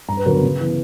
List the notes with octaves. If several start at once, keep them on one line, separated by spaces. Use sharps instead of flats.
G2 A#5
B4
D3 F#3 B3 A#4
B4
C#3
E3 B3